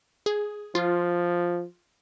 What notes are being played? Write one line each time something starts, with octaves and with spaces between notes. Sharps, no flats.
G#4
F3 F4